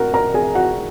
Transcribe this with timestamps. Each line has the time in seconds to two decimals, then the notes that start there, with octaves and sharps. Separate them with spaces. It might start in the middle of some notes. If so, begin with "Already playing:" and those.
Already playing: F#4 A#4 A#5
0.14 A#4 A#5
0.34 G#4 G#5
0.55 F#4 F#5